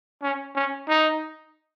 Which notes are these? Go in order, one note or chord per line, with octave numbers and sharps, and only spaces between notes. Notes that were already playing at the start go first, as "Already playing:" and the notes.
C#4
C#4
D#4